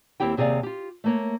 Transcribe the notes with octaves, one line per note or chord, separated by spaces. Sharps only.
D#2 C4 E4 G4 G5
D#2 C3 G#4 C#5 D5 F5
F4 G4
A3 A#3 C#5